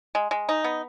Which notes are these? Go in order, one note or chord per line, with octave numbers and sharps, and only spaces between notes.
G#3
G#3
D#4
B3